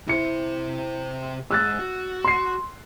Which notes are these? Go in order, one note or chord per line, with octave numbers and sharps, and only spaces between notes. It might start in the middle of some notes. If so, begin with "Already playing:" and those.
C3 E4 C5 C#7
G#2 E6 F#6 A6
F#4
C6 C7